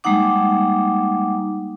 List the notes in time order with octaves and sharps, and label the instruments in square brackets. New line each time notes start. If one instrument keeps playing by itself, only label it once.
[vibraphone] G3 G#3 A#3 D#4 F#5 D6